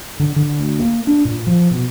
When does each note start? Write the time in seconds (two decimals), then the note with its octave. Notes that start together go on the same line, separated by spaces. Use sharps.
0.20 D3
0.36 D3
0.59 D2
0.79 A#3
1.07 D4
1.25 A#2
1.47 F3
1.71 B2